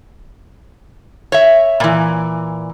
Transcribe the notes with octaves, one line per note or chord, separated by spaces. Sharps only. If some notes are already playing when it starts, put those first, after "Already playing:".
C#5 E5
A#2 E3